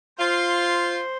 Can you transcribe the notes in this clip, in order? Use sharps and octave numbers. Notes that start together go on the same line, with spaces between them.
F4 C5